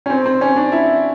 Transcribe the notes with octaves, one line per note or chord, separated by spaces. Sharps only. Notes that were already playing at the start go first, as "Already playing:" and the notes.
C#4
C4
C4
C#4
D4
E4